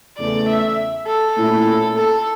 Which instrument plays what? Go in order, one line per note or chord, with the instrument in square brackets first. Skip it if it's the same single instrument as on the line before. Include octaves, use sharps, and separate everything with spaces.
[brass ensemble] E2 C#3 E3 A3 [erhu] D5
[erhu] E5
A4
[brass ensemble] A#2 A3 C#4 E4
[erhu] A4